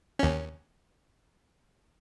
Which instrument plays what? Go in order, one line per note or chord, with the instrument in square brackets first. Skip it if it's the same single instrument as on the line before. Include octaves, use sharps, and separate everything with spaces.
[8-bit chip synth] D#2 C#4